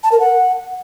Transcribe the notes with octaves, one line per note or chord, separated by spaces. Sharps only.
A5
A#4
F#5